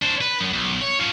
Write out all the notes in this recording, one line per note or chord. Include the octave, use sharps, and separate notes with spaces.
D4 C5
B4
F#2
B1
C#5
F3 C#4